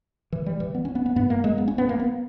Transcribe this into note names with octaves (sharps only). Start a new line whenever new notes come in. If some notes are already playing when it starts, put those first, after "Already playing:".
E3
G3
E3
B3
C#4
B3
B3
G2 B3
A#3
G#3
B3
C#4
B3
A#3
B3